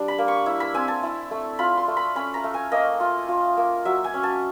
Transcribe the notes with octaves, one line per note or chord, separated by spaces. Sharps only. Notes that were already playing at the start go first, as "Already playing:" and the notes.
Already playing: G3 D4
B5
A#3
C#6
E4
B5
C4 G#5
A5
E4
A3
F4 B5
C6
A3
B5
C#4 B5
A#5
A3
G#5
A#3 D#5
F4
F4
A#3
F#3 E5
G#5
C#4
A5